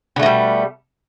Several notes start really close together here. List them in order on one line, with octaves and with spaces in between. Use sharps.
D3 A3 B2 G3